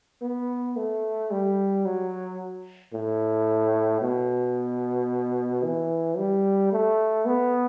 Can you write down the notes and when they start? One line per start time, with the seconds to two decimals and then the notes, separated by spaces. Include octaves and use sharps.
0.22 B3
0.76 A3
1.31 G3
1.85 F#3
2.93 A2
4.01 B2
5.63 E3
6.18 G3
6.72 A3
7.25 B3